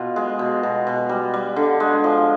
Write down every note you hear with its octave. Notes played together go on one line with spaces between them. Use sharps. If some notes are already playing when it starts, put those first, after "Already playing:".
Already playing: B2 F4
G#3
B2
B2
B2
G3
G3
D3
G#3
F3